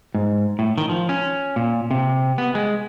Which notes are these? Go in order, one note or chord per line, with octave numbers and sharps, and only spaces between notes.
G#2
A2
D#3
F3
C#4
A#2
C3
B3
G#3